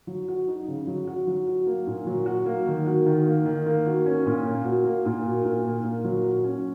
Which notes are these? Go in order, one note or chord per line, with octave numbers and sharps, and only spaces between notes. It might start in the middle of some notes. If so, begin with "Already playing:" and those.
F#3
F#4
D#4
C#3
F#3
F#4
F#3
F#4
A#3
A#2
F#3
F#4
A#3
D#3
F#4
D#3
A#3
D#3
A#3
F#4
C#4
A#2
A#3
F#4
A#3
A#2
F#4
A#2
A#3
A#2
F#3
F#4
C#4